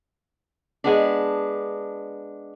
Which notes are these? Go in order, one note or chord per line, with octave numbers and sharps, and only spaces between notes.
G#3 B3 D4